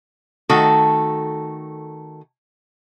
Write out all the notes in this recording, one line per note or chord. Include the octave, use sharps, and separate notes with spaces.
D#3 A3 F#4 A4